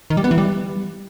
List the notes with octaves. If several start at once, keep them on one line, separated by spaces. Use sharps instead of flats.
D#3
G3
B3
E3
G3